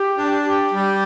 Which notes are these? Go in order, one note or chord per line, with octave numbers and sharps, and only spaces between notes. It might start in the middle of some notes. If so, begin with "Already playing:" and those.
Already playing: G4
D4
G4
G3